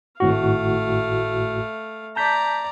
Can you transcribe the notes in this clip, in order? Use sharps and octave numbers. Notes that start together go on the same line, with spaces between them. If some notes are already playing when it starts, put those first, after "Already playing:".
G#1 A2 A3 F#4 F5
D5 A5 A#5 G6 B6